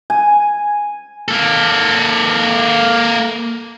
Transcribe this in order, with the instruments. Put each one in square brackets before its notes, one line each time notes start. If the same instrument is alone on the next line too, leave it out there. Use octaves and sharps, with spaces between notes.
[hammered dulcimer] G#5
[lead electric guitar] A#3 A4